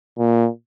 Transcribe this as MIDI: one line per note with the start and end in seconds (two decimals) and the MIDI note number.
0.18 0.49 46